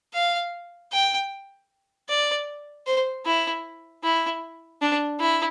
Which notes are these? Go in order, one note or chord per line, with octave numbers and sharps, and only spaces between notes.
F5
G5
D5
C5
E4
E4
D4
E4